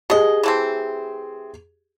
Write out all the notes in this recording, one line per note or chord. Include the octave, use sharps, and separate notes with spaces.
B2 G4 G#4 D#5
E3 A3 C4